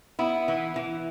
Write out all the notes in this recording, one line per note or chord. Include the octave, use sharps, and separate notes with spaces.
B3 E4
E3
E3